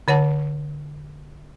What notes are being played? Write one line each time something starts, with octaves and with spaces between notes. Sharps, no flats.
D3 C#5 F#5 A5